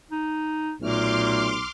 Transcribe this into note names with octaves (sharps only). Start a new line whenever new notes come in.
D#4
B1 A#2 A3 C6 D6 F6